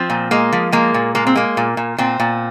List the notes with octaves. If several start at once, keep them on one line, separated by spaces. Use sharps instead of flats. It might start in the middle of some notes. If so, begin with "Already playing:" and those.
Already playing: F3 C4
A#2
G#3 A#3
F3
G#3 A#3
A#2
G#3 A#3
C4
G#3 A#3
A#2
A#2
A#2 C4
A#2